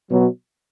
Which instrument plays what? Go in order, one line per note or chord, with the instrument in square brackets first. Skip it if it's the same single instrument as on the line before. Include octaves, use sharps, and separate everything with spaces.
[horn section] B2 F#3